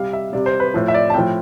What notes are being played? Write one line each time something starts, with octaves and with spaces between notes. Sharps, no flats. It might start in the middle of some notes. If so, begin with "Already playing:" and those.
Already playing: C3 G3 F5
E5
C3 G3 D5
C5
B4
A2 F3 C5
E5
D5
A5
A2 F3 G5